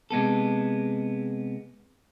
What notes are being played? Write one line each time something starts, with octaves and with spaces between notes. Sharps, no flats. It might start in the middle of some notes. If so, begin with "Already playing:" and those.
C3 G#3 B3 A4